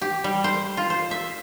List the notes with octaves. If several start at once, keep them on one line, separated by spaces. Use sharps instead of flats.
G4
G3
C5
F4
C5
E5